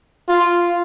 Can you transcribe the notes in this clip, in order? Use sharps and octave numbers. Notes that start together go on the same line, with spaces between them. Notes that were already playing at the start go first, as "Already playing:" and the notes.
F4